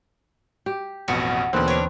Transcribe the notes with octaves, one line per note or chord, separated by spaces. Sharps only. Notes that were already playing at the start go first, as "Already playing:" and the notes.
G4
A1 F2 B2 F#4
D#2 B2 D3 E3 A#3 C4 B4
D4 C5 C#5